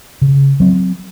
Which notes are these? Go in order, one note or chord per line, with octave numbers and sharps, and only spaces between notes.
C#3
F#3 C4